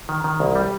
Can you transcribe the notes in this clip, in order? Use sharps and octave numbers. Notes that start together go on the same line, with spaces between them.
D#3
D#3
C2
G3